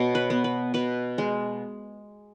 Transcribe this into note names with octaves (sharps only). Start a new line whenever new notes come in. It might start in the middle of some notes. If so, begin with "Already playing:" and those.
Already playing: B2 C#5
B4
B3
B4
B2 B4
G#3